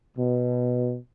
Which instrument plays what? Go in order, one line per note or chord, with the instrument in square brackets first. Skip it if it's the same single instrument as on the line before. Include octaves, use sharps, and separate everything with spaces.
[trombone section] B2